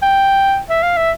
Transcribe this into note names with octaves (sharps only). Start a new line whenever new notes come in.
G5
E5
F5
E5